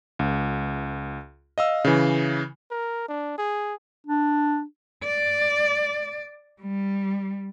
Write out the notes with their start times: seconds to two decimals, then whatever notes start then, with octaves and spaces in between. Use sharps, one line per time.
0.19 C#2
1.58 D#5 F5 E6
1.85 C#3 E3
2.71 A#4
3.09 D4
3.38 G#4
4.07 D4
5.04 D5
6.62 G3